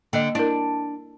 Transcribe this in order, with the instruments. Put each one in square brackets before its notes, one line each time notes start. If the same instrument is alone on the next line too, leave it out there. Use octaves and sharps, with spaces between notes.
[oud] D3 [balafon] A#3 D#5
[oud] D4 [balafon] E4 A#4